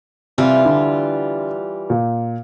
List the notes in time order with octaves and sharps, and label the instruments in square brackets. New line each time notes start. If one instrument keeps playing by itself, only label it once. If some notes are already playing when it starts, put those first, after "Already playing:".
[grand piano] C3 [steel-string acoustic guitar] E3 G3 F4
[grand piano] D3
A#2